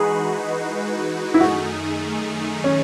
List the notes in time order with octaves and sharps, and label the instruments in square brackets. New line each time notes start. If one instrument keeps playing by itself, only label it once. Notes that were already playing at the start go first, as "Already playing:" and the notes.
Already playing: [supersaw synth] E3 G#3 D#4 F#4 B4 [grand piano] G#4
[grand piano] E4
[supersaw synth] F#2 D#3 A3 D#4 G#4 [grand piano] F#4
[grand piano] C#4